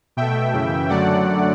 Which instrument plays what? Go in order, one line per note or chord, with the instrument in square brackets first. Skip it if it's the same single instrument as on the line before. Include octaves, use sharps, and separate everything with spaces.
[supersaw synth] B2 A3 E5 G5
F#2 C#3 E3
F#2 D3 F#3 A3 D5 F#5